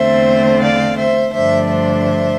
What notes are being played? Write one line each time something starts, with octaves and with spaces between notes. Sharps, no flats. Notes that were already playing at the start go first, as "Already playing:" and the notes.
Already playing: E2 D3 A3 C4 C5 E5
D5 F5
C5 E5
G2 D3 F3 A3 D4 C5 E5
C5 E5